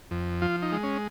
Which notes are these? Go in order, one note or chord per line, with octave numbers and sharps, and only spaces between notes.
F2
F3 F4
D#4
G#3
C#4